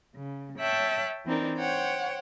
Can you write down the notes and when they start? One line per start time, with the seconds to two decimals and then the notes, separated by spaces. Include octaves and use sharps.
0.16 C#3
0.59 C#5 E5 G5 A5 F#6
1.26 E3 C4 D4 D#4 A#4
1.58 C5 C#5 F#5 G5